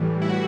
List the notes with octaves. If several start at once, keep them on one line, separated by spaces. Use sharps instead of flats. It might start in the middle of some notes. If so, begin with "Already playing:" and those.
Already playing: A2 E3 G3
E4
F#4